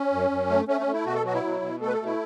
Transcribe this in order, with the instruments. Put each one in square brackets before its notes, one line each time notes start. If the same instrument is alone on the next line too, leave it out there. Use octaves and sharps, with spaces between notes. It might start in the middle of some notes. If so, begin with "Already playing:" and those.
Already playing: [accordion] C#4
F#2
F#2
A3
A3 C#4
C#4
A3
E4
B2 F#4
A4
F#3 F#4
E4
B2
B2
A3 A4
B4
A4
B2
E4